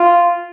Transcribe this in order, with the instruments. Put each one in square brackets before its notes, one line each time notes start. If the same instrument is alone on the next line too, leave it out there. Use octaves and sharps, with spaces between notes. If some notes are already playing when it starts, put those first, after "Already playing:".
Already playing: [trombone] F4